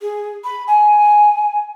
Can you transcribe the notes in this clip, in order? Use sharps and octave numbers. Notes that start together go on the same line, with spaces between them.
G#4
B5
G#5